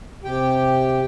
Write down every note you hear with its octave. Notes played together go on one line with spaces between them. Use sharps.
C3 G4 G5